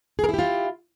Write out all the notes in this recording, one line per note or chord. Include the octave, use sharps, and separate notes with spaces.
E4 F4 G4 G#4 A#4